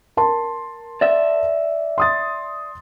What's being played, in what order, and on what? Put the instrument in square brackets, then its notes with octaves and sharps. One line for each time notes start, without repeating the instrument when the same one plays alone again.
[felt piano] A#4 A5 C6
[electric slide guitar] D5 E5
[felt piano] C6 D#6 A6